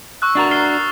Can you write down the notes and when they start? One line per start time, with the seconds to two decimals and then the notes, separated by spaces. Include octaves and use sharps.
0.22 C#6 E6 F#6
0.35 D4 F#4 A#4 E6 A6 F7
0.51 F6 C7 G7